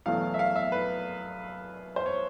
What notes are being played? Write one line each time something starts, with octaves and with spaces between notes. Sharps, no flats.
E2 B2 F#3 A3 F5
E5
F5
E5
B4
C5
C#5